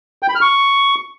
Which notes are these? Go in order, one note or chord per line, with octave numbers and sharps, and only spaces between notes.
G5
B5
F6
C#6